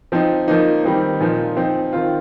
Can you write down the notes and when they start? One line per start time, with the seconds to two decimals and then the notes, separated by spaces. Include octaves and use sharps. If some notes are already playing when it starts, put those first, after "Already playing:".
0.12 F3 C4 D#4
0.48 F3 A#3 D#4
0.84 D#3 G3 C4 D#4
1.20 A#2 F3 D#4
1.57 F3 C4 D#4
1.93 D#3 C4 F4